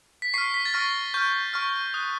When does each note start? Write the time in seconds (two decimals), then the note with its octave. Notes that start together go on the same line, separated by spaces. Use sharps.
0.22 B6
0.34 C#6 F6 C7
0.54 B6
0.65 A6
0.74 C#6 F6 A#6
1.14 C#6 F6 G6
1.53 C#6 F6
1.94 D#6 F#6